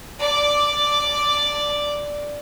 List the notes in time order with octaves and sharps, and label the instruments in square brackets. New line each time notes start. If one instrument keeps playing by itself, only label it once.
[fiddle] D5 D6